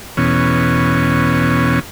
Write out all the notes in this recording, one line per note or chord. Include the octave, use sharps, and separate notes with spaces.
E2 B2 C#4